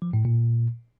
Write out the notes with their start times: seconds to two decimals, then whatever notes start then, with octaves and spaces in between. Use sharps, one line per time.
0.02 F3
0.13 A2
0.25 A#2